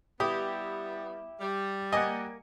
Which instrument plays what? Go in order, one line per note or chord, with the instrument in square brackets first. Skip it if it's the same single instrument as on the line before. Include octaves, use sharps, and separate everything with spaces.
[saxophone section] G3 B3 [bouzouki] E4 [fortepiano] G4 D#6
[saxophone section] G3
[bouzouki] A#3 G#5 [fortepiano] D#5 F#5